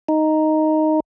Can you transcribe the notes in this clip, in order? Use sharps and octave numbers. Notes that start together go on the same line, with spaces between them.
D#4